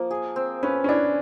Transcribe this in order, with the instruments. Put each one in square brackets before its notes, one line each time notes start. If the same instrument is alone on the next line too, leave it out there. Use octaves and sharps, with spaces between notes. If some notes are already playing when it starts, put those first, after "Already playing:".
Already playing: [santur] F3 A#3
G#4
C4
[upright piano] C#4 [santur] B4
[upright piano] C#4
[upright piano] D4 [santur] E4